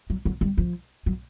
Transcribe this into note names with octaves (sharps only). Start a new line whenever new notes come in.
F#3
F#3
G3
F3
F#3